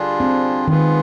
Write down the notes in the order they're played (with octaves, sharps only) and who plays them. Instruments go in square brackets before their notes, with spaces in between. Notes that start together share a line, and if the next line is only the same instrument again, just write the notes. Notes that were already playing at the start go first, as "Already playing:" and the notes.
Already playing: [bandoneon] D3 G3 D4 F4 G#4
[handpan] C4
[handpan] D#3 [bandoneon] G#3 B3 F4 G#4 B4